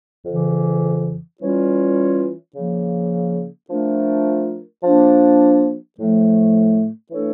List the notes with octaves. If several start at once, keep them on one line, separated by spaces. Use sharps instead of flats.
F2 C#3 E3
E3 G3 C#4 F4 C#5
C#3 F3 A#3
F3 A3 D4 F4 A#4
F3 A#3 D4
A2 F3 A3
E3 A3 D4 A4 C#5